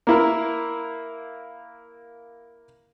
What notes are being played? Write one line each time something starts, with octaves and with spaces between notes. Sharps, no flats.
A#3 E4 A#4